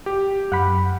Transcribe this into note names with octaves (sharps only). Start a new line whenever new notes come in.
G4
F#2 F#5 B5